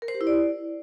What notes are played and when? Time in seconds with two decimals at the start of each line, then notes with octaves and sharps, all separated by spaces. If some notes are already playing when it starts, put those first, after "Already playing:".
0.02 A#4
0.08 C5
0.14 G4
0.21 E4
0.27 D5